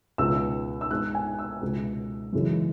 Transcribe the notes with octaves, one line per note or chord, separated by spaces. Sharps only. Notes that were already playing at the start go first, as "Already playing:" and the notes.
C#2 B2 B3 E6
E6
G#2 G#3 B3 F#6
G#5
E6
C#2 B2 G#3 B3
F#2 C#3 E3 G#3